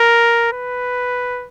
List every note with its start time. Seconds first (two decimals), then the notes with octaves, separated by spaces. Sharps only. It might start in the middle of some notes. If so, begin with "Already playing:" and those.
Already playing: A#4
0.52 B4